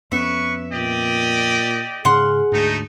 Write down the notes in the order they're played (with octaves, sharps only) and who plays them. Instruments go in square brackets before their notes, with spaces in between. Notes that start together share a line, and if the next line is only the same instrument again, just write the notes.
[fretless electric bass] F2 B3 C#4 [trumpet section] B4 C#6 [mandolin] E5
[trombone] A#2 [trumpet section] G4 D5 D#5
[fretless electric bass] G#2 C#3 C#4 [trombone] G#4 [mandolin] F#5 C6 F6
[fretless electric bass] D2 G#2 [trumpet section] A3 D#4